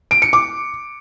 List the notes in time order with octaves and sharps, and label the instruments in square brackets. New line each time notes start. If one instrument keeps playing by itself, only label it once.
[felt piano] D7
C#7
D6